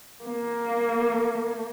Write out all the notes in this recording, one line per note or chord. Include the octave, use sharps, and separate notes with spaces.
A#3